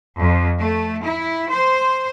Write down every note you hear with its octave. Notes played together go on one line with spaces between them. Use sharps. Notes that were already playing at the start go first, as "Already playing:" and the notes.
F2
A3
E4
C5